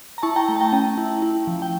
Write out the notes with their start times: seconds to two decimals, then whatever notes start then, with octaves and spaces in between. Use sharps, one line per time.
0.18 A#5
0.23 E4 A5 C#6
0.36 G5 A#5
0.48 A3 G5 A#5
0.56 A5
0.61 G5 A#5
0.72 C#4 G5 A#5
0.98 E4
1.22 E4
1.47 F3
1.62 G5